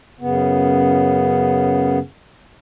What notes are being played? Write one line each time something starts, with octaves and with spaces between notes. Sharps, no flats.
F#2 C#3 B3